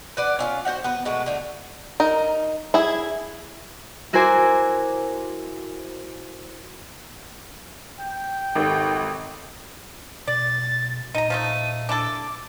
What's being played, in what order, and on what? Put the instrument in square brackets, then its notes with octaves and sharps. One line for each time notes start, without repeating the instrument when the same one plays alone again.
[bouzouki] B4 D5 F#5
C#4 E4 F4
F#4 C5 E5 F#5
B3 B4
B2 G#3 A3 F#4
D3 A3
[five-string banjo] D#4 A#4
E4 G#4
[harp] E4 F#4 A#4 C5 G#5 D6
[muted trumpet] G5 [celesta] G6
[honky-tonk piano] G#1 [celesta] G4 A4 A#4
[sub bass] B2 [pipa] D5 [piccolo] A6
[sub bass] A#2 [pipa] D#4 A#5 [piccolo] D#7
[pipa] F3 A3 D#4
[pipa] D4 E4 A4 [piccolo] D6